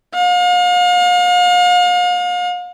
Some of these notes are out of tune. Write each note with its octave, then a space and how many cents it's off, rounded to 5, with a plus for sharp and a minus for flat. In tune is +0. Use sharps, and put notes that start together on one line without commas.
F5 +40